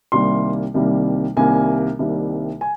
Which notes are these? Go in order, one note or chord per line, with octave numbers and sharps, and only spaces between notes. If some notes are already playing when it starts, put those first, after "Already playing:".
C2 C3 D#3 G3 A#3 C6
C2 C3 D#3 G3 A#3
C2 C3 D#3 G3 A#3 G#5
C2 C3 D#3 G3 A#3
G#5